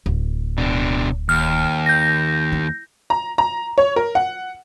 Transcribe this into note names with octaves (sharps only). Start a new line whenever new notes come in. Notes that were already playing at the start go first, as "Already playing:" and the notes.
D1
B2 D4
D#2 F6
G6 A#6
E4
A#5
A#5
C#5
A#4
F#5